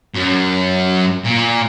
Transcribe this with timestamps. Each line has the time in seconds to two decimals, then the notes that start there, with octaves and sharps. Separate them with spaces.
0.15 F#2
1.25 A#2